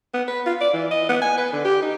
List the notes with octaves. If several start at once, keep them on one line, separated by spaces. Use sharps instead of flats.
B3
B4
F4
D5
E3
D#5
B3
G#5
B4
D3
G4
D#4